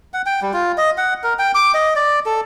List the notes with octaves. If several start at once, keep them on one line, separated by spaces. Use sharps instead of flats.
F#5
G5
G3
F4
D#5
F#5
A#4
G5
D6
D#5
D5
A4